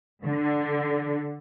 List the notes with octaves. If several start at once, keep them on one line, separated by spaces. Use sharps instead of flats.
D3